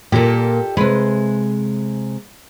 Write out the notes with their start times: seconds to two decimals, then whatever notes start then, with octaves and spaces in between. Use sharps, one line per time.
0.12 A#2 G4 A4
0.77 C3 G#3 B4